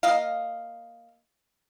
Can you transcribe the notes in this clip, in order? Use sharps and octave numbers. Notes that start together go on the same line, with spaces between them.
A#3 D#5 F5